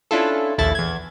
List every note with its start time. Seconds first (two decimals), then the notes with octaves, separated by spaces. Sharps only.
0.11 C#4 D4 E4 F4 A4
0.58 A#1 D#2 E4 A4 A6
0.75 E2 G#6